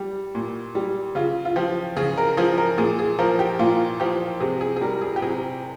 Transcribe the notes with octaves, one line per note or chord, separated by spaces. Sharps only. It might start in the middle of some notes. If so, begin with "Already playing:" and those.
Already playing: G3
A#2
G3
C#3 F4
F4
F3 G4
C#3 G#4
A#4
F3 G#4
A#4
A#2 G#4
G#4
F3 A#4
G4
A#2 F4
F3 G4
C3 G#4
G#4
G#4
G3 A#4
G#4
G4
C3 G#4